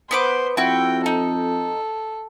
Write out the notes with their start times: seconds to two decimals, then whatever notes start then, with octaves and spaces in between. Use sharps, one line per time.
0.11 B3 B4 C5 D6
0.57 F2 E4 F#4 G5
1.06 D#4 A4